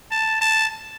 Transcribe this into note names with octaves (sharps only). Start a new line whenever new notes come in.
A5
A5